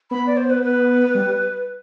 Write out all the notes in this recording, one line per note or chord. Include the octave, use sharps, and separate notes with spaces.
B3 B5
D5
C5
B4
B4
G3